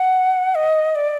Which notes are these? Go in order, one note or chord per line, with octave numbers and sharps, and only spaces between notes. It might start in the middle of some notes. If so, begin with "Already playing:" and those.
Already playing: F#5
D#5
D5